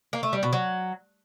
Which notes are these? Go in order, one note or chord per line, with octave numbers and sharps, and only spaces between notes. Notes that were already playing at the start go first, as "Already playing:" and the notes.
A#3
A3
G3
B2
F#3